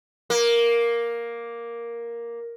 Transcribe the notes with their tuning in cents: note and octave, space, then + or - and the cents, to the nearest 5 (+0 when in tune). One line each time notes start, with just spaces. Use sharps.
A#3 +5